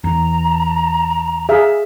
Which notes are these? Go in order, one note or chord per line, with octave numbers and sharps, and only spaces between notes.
E2 A#5
G#4 E5 F5